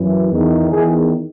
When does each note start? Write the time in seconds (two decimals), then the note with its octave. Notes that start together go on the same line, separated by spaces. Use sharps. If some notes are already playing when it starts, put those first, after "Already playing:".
Already playing: F#2 E3
0.30 E2 D#3
0.71 E2 D#3 G#4